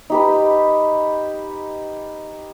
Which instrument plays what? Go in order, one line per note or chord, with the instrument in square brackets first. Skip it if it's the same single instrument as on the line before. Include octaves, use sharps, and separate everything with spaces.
[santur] D#4 G4 B4